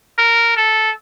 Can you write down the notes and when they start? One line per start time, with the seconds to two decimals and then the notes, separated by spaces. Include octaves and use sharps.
0.18 A#4
0.57 A4